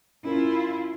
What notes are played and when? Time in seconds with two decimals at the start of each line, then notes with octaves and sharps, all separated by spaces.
0.25 C#4 E4 F4 A#4